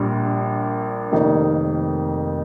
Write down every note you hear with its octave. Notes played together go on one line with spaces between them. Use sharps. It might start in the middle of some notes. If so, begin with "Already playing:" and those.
Already playing: A#1 A#2 G3 D4
F1 F2 D#3 A#3 D#4